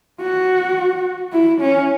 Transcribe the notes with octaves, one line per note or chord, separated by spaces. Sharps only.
F#4
E4
C#4